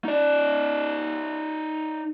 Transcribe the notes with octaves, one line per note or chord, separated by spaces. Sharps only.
D#4 D5